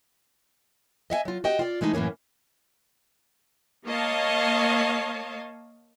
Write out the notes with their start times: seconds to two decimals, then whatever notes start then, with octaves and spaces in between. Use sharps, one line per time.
1.10 D#5 E5 F#5 G#5
1.25 F#3 F4
1.44 F#4 G4 D#5 G5
1.59 F4 D5
1.81 E3 G#3 A3 D#4
1.94 F#2 A2 E3 A#3 C#4
3.87 A#3 C#5 D#5 F5 A5